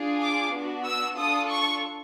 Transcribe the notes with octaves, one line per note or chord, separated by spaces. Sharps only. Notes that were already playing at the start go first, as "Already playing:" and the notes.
Already playing: D4 F4 G#4
D6
B3 D4 F#4
E6
D4 F4 A4 D#6
C#6